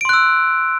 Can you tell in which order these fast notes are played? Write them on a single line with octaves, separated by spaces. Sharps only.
D7 C6 F#6 E6